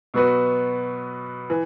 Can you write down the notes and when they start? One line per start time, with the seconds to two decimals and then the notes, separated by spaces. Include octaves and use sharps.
0.14 B2 F#3 B3 F#4 B4
1.50 E3